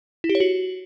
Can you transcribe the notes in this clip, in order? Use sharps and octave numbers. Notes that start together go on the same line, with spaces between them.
E4
G4
C#5
F#4